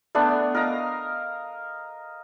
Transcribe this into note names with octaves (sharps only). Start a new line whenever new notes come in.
A3 B3 D4
A#4 D#5 F5 A#5